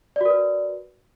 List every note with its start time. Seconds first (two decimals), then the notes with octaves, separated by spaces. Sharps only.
0.16 D5
0.21 F#4
0.25 A#4
0.30 B4